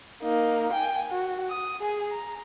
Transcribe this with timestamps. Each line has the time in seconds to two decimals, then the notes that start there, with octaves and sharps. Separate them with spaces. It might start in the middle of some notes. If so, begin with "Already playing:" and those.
0.23 A#3 D#4
0.73 G5 G#5
1.11 F#4
1.50 D#6
1.81 G#4 G#5
2.12 A#5